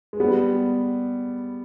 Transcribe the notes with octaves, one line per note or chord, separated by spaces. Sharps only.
G#3
G3 B3